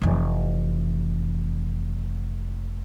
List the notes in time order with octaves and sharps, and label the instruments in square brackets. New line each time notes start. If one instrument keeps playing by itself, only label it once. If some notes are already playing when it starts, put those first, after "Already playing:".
[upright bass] F1 E3